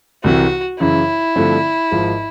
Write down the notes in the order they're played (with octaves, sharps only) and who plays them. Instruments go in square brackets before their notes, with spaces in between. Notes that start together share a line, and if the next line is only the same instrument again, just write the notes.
[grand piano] C2 C3 E3 [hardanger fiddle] F#4
[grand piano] F#2 C#3 E3 [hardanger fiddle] E4
[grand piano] G2 D3 F3 A3 C4
G#1 G#2 F3